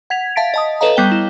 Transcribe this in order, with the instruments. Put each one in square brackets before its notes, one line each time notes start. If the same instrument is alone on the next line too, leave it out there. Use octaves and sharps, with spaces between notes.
[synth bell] F#5 G#6 B6 F7
E5 F5 A5 A6 B6 D7
D#5 A5 D#6
A4 B4 C#5 D#5 F5 A#5
G3 B3 G5 G7
E4